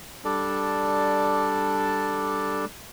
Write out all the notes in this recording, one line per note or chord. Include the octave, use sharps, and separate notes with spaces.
G3 D4 A4 D5